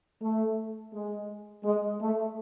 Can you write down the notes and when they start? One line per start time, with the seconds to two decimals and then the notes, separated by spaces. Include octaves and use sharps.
0.22 A3
0.93 G#3
1.64 G#3
2.01 A3